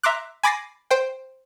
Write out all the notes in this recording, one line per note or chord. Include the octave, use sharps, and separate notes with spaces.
E5 A#5 C6 D6 F#6
G#5 B5 D6 A6 A#6 C7
C5 G5